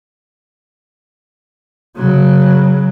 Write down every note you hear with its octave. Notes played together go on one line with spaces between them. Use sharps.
C#3 F#3